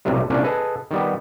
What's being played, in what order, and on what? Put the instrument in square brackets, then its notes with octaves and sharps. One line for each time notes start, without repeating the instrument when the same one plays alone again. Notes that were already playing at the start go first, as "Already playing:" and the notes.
[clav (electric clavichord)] B1 A2 C3 G3
C2 A#2 C#4 D4 G#5
G#4 A4 B4 D#5
D#3 G3 B3